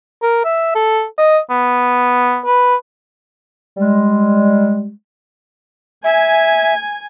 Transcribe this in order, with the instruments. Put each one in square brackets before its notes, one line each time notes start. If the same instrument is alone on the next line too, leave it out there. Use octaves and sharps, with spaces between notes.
[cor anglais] A#4
E5
A4
D#5
B3
B4
[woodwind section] G3 G#3
[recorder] E5 [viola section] G#5